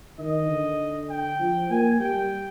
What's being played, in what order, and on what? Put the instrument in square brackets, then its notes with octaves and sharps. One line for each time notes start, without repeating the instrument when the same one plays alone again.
[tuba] D#3 [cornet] D#5
[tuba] D3
[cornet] G5
[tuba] F3
[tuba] A#3 [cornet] G#5
[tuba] G3 [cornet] G5